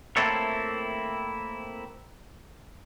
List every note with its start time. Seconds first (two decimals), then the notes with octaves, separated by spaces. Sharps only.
0.17 A3 A#3 C4 E4 A4 C#5